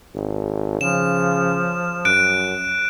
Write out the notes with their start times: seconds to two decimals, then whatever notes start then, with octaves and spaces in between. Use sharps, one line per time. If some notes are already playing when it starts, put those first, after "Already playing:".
0.14 G#1
0.81 C#3 F3 E7
2.05 F#2 F#6 D7